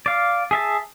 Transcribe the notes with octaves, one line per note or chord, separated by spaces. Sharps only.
D5 F5
G#4 E5 A5